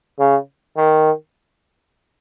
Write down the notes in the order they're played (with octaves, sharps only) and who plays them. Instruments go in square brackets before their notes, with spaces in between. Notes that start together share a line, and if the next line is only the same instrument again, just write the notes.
[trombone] C#3
D#3